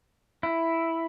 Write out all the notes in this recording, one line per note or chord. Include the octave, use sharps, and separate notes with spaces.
E4